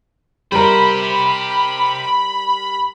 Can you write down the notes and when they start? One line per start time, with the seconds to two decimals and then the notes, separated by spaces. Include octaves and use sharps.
0.52 G3 G4 A#4 C5 B5